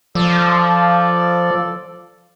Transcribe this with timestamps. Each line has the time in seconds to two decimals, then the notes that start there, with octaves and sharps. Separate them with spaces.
0.15 F3 A4 D5